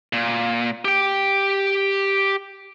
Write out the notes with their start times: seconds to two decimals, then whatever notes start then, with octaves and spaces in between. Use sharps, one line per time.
0.13 A#2
0.85 G4 G5